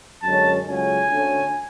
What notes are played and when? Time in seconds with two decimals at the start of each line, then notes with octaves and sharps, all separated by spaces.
0.22 F#2 D3 G#3 C#4 A5
0.65 C#2 C#3 F#3 A3 C#4 G#5
1.08 D2 D3 A3 C#4